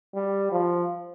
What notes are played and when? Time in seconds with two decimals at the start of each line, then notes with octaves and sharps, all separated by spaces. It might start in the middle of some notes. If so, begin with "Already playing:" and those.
0.15 G3
0.52 F3